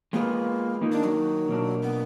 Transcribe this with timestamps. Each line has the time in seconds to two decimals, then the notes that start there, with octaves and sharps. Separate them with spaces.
0.13 G#3 A#3 B3 F4 G#4 B4
0.81 D#3 A#3 D#4 A#4
0.92 D4
1.04 F#3
1.49 B2 A#3 D4
1.82 B3